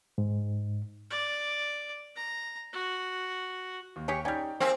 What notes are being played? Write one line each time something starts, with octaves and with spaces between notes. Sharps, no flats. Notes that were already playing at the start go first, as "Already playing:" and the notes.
G#2
D5
A#5
F#4
D#2
G4 G#4 C#5
G3 C#4 D#4 D5 G5
A#3 C4 G4 G#4